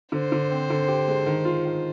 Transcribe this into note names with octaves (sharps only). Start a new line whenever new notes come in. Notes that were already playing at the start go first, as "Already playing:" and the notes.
D3 C5
D3
C4
D3
G4
G#3
D#3
F4
D#3